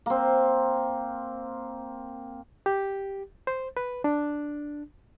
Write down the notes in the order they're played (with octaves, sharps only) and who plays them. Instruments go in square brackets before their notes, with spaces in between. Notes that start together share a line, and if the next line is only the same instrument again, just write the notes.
[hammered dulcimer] A#3 C4
[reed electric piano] G4
C5
B4
D4